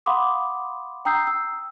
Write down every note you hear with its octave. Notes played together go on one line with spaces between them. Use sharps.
F5 F#5 B5 C6 D6 D#6
G5 A#5 D#6 E6 G6 C7
E6